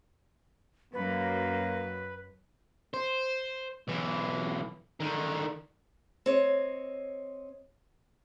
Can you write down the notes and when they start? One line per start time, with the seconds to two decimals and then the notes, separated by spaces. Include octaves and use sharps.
0.94 F#2 F#3 A#3 B4
2.94 C5
3.88 B1 E3
5.00 D3 D#3
6.26 C4 C#5 D#5